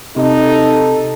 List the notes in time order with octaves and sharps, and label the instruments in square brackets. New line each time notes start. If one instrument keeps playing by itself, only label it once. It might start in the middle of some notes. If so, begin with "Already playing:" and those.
[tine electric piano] C3 [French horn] D#4 [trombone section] A4